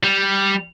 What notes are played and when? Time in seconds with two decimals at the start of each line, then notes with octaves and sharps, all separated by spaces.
0.04 G3